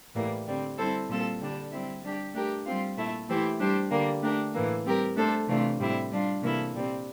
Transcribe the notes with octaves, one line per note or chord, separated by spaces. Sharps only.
A2 E3 G3 A#3
D3 G3 C4
G3 C4 E4 A4 C5
A#2 G3 C4 F4 A4
D3 G3 D4
G3 C4 E4
G3 D4 G4
A3 D4 G4 A#4
G3 C4 F4
A#2 A3 E4
E3 A3 E4 G4 C5
G3 D4 G4 C5
D3 G3 A#3
A3 D4 G4 A#4
A2 E3 A#3
G3 C4 G4 A#4
A3 D4 A4 C5
C3 E3 A3 D4 F4
A2 G3 C4 E4
G3 D4 F4
C3 E3 A#3 E4 A4
A#2 G3 C4